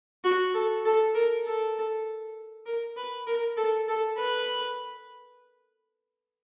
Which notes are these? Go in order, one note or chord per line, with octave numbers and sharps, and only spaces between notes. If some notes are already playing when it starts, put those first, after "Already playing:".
F#4
A4
A4
A#4
A4
A#4
B4
A#4
A4
A4
B4